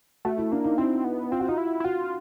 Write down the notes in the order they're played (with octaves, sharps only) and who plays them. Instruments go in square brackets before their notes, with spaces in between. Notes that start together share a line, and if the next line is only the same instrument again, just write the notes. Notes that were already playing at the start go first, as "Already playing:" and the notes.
[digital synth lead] A3 [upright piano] F#4
[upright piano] E4
[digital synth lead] A#3 [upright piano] D4
[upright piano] D#4
[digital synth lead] C4 [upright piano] E4
[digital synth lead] B3
[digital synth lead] C4 [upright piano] F4
[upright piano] F#4
[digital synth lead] D#4 [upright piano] F4
[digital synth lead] E4
E4
[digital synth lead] F4 [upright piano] F#4